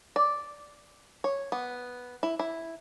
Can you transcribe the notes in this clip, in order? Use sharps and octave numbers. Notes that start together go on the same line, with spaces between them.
D5
C#5
B3
E4
E4